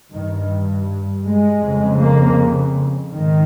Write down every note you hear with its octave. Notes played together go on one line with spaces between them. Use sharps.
G2 D#3
G#3
F2 C#3
A#3
G#2 D#3